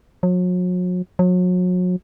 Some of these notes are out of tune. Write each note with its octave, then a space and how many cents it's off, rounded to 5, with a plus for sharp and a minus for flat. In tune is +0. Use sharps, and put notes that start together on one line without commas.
F#3 -40
F#3 -35